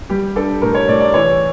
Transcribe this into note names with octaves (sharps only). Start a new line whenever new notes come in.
G3 G4
D4 A4
A2 A#4
C#5
A2 D5
D5
E3 C#5